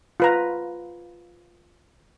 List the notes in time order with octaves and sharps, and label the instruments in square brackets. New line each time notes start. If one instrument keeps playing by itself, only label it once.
[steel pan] F4 B4 A#5